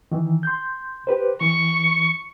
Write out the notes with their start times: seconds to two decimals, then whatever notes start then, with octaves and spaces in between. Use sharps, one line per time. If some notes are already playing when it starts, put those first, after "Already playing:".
0.12 D#3 E3
0.43 C6 G6
1.07 G4 B4 C5
1.41 E3 C#6